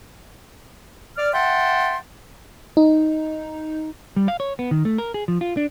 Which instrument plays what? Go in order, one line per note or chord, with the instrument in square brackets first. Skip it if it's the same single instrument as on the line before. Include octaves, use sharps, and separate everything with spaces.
[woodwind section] D5 F6
E5 F#5 G5 A5 C6
[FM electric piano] D#4
[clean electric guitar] G3
F5
C#5
B3
D#3
A3
A#4
G#4
F3
F4
D4